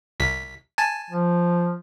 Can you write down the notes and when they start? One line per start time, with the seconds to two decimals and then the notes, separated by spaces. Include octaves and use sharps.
0.20 C2 B6
0.78 G#5 A5
1.10 F3